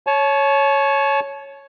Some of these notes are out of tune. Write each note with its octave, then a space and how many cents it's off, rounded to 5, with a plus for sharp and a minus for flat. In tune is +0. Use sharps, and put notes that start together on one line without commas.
C#5 +0 A5 -35